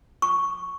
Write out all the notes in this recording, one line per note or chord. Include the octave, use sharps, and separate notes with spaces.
C#6